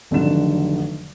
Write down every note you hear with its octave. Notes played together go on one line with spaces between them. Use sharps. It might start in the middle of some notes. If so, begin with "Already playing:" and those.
F1 D3 D#3 F#3 E7